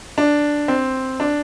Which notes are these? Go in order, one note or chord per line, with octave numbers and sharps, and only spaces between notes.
D4
C4
D4